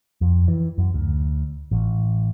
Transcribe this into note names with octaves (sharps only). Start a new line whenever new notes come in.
F2
E3
F#2
D2
A1